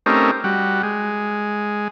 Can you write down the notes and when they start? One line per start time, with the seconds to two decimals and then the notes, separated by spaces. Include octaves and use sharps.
0.06 A3 C4 C#4 D#4 G4 A#4
0.44 G3 F#4
0.83 G#3